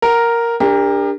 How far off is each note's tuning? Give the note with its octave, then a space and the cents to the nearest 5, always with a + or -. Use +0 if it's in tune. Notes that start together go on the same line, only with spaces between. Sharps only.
A#4 +0 F#5 +20
D4 +0 G4 +35 A#4 +0